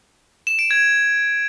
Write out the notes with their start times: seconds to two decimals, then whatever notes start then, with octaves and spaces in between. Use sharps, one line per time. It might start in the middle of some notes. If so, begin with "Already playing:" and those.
0.47 E7
0.59 D7
0.71 G#6